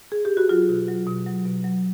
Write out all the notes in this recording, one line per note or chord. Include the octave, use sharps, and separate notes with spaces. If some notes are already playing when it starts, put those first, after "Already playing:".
G#4
G4
F#4
F#3 F4
B2
F#3
B2
F#3
B2
F#3